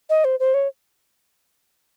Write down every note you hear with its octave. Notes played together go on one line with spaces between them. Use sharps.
D#5
C5
C5
C#5